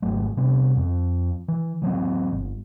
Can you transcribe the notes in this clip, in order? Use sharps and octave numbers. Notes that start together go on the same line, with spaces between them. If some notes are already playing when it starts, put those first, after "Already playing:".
G#1 F#3 A3
C3 G3 B3 D4
F2 F3
E3
E3 F#3 G#3 C4
G1